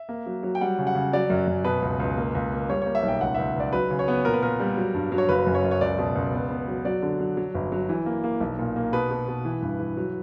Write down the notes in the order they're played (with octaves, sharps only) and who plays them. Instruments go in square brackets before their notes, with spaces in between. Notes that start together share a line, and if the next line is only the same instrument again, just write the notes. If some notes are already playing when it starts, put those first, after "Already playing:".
Already playing: [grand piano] E5
A#3
F#3
F#3
G5
G3 F#5
C#3
F#5
C#3
F#3 D5
F#2
F#2
B2 B4
C#2
C#2
A#3
C#2
A#3
G3 C#5
A#3 C#5
E5
B1
G5
C#2 F#5
C#2 E5
C#2 D5
F#3 B4
C#3
C#5
B3
A#2 A#4
B4
A#2 A#4
G3
F#3
G2
F#3
C#5
F#1 B4
F#2
C#5
F#2
C#5
C#2 D5
B2
C#2
B3
B3
F#3
F#3 D5
D3
F#3
F#3
G1
F#3
E3
A#3
A#3
B1
A#2
A#3
B2 B4
B2
B2
E3
G2
E3
F#3